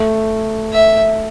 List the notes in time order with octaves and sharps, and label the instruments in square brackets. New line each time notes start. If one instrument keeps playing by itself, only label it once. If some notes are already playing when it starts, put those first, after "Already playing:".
Already playing: [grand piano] A3
[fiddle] E5